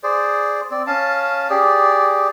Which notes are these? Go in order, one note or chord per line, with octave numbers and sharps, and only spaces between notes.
G#4 C5 D5
C4 D5
C#4 F5 A5
G4 G#4 D5